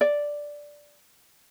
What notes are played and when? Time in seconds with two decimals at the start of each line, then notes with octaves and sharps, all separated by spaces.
0.01 D5